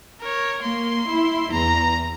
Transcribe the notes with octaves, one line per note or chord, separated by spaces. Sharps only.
A#4 C#5
A#3 C6
E4
E2 A#5